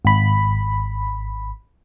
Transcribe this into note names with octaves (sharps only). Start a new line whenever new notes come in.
G#1 B5